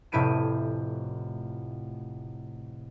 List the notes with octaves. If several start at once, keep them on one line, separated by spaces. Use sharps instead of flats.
F1 A2 E4 B4 D7 D#7